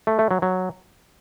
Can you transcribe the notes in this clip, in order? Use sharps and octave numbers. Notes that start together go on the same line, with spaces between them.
A3
A3
F#3
F#3